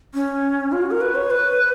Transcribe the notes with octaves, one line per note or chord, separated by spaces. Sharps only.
C#4
F4
F#4
A#4
B4
C#5
B4